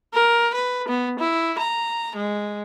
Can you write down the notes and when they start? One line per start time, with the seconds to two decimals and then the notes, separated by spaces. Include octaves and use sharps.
0.14 A#4
0.54 B4
0.88 B3
1.19 E4
1.58 A#5
2.16 G#3